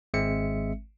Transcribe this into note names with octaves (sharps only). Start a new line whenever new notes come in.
G#1 G#3 C4 E5 C#7